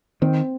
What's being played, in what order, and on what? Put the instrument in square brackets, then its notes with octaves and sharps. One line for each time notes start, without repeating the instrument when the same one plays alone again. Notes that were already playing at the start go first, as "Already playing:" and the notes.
[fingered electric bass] D#3 [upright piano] C4